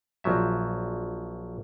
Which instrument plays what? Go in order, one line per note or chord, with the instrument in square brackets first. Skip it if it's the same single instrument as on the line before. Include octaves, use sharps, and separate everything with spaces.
[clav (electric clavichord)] A#1 F3 F#3 E5